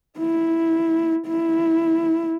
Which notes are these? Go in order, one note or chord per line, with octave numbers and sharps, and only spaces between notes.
E4
E4